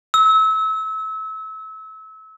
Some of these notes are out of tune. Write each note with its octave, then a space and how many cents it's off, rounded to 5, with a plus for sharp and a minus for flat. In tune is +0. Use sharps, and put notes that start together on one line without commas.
E6 -30